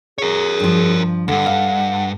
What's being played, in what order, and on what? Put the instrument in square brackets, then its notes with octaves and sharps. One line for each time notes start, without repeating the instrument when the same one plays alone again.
[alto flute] G#4 [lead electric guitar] A#4 C#5
[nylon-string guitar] G2 F3
[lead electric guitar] C#2 G2 [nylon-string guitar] D3 [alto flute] F#5
[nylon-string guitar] F5